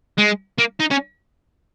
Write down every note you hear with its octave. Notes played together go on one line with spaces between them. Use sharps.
G#3
A#3
D#4
C#4